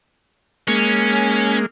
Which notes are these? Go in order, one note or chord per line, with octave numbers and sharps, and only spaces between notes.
G#3 A#3 C#4